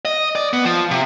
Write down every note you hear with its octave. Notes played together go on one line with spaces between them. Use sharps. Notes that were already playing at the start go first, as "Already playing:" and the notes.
D#5
D5
B3
F3
C3